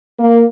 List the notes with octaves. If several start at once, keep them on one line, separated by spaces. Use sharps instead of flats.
A#3